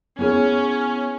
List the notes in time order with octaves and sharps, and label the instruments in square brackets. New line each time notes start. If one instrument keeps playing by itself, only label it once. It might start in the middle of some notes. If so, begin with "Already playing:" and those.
[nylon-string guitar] B3 E4 G#4 C#5 [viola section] C#4